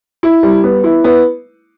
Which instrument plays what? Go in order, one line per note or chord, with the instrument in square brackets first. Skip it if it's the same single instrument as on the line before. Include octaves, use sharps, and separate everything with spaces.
[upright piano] E4
G3
B3
E4
B3